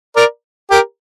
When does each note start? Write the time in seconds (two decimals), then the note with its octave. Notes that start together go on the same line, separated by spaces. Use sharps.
0.16 A#4 D5
0.71 G4 A#4